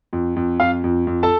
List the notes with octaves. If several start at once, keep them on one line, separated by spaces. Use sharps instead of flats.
F2
F2
F2 F4 F5
F2
F2
A4 A5